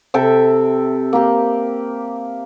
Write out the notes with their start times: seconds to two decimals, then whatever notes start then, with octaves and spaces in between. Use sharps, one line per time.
0.14 C3 A4 E5 G5
1.13 A#3 G4